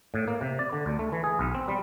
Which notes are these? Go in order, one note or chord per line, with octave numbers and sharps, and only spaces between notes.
A2
A#3
C3
D5
D3
D2
A3
E3
G#4
B1
C4
G3